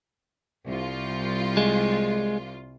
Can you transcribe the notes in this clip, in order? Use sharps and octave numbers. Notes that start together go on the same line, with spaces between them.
C2 F4
G#3